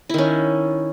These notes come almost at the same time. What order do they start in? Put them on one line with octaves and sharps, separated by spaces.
E4 D#3 C#4